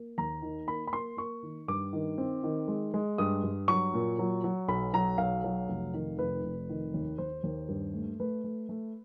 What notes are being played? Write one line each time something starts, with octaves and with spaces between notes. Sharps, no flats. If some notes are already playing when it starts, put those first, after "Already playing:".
Already playing: A#3
D#2 A#5
D#3
A#3 B5
B5
A#3 C6
A#3 C#6
D#3
G2 D6
D#3
C4
D#3
G#3
G#3
G2 D#6
G2
F#3 C#6
A#2
F#3
F#3
B1 B5
F#3 A#5
B1 F5
F#3
F1
D#3
F1 B4
F1
D#3
D#2
D#2 C5
D#2
G2
A3
A3 B4
A3
A3